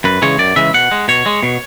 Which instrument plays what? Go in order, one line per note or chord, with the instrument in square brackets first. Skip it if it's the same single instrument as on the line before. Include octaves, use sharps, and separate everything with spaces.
[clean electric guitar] F#2 B4
C#3 E3 G#3 C#5
F#2 D5
C#3 E3 G#3 E5
B2 F#5
G#3
B2 C#5
G#3
B2